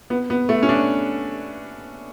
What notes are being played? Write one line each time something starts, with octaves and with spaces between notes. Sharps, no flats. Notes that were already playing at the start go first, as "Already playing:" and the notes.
B3
B3
A3
C#4
D4